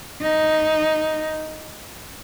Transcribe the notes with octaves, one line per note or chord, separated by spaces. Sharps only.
D#4